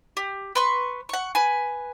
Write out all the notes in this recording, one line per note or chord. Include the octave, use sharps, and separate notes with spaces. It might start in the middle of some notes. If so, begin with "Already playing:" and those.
G4
B4 C6 C#6
F#5 C#6
B4 G#5